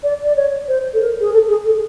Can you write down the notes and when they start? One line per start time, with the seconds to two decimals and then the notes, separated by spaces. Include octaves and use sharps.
0.03 D5
0.24 D5
0.36 C#5
0.68 C5
0.94 A4
1.01 A#4
1.20 G#4
1.33 A4
1.49 G#4
1.66 A4